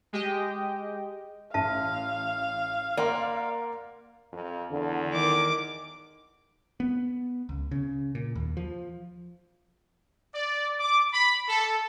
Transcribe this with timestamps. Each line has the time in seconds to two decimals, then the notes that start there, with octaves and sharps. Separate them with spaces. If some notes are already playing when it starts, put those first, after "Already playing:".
0.13 G#3 G4 D#5 G5
1.54 A1 E5 F5 A5
2.97 A#3 D5 F#5 C6
4.32 F2
4.71 E2 D3
5.14 D#3 D6
6.80 B3
7.49 C#2
7.71 C#3
8.15 A#2
8.36 D#2
8.57 F3
10.35 D5
10.80 D6
11.13 B5
11.49 A4